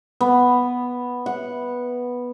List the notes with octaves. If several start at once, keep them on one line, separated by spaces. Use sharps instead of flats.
B3
F#5